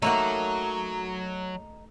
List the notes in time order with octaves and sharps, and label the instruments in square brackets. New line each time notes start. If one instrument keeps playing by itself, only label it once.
[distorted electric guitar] F#3 [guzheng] A3 A#3 F#4 [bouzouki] D#4